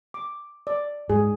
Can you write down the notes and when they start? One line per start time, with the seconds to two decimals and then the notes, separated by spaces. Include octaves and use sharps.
0.14 D6
0.67 D5
1.10 G#2 G#4